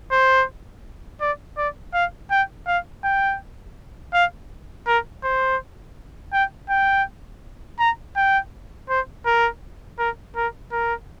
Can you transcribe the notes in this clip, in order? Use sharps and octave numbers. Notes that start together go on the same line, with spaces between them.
C5
D5
D5
F5
G5
F5
G5
F5
A#4
C5
G5
G5
A#5
G5
C5
A#4
A#4
A#4
A#4